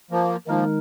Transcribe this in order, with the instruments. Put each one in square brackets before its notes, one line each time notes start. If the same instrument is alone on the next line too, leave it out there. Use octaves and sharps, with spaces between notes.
[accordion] F3 A#3
[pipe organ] D#3 G#3 D#4 A#4 [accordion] F3 A#3